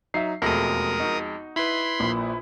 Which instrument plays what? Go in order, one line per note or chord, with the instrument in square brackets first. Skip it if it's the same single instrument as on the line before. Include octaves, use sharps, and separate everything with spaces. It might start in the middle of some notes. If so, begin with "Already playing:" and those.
[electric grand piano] F#3 D#4 [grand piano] E5 C7
[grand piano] E1 A3 A#6 [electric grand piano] F2 G#3 [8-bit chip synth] A#4 D#6
[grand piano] D#4 F#4
[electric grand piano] E4 B4 [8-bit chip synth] B5 C6
[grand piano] A#1 A#2